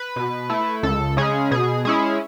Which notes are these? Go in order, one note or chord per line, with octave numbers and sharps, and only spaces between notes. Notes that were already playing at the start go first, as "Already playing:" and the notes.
Already playing: B4
B2
A3 E4
C#2 A4
C#3 G#3 C#4 G#4
B2 G#4
G#3 C#4 E4 G#4